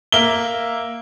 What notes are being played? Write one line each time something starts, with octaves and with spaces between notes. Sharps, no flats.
A#3 E5 G7